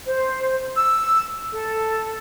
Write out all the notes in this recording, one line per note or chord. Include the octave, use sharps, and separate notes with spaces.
C5
E6
A4